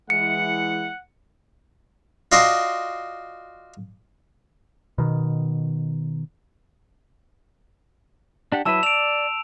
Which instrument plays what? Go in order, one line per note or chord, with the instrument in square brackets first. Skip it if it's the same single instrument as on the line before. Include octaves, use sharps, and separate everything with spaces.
[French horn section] E3 G#3 E4 [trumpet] F#5 [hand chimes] C#7
[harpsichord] F4 F#4 D5 D#5 A5 C6
[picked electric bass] B2 D#3
[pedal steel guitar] D4 G4 F#5
[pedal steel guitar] F#3 E4 B4 [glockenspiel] A5 E6 E7
[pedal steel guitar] D5 [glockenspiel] D7 F7